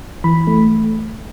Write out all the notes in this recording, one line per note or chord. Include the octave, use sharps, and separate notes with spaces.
E3 B5
A3